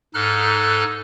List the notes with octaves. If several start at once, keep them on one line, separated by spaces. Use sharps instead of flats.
G#2 D#4 A4 F6 F#6